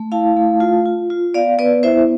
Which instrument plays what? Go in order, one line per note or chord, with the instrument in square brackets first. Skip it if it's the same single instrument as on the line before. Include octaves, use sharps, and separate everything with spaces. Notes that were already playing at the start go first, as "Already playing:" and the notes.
Already playing: [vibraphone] A3
E4 F5 A5
A3
F4
F4
F4
B3 D5 F5
B3 B4 D5
E4 C5 E5